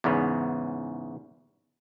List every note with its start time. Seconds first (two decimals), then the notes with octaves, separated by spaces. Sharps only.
0.04 E2 G#2 C#3 B3